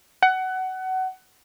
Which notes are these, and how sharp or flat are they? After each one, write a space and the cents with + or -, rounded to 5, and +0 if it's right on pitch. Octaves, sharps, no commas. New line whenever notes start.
F#5 +20